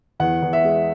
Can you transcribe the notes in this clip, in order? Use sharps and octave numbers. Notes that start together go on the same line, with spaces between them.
E2 F#5
E2
E5
G#3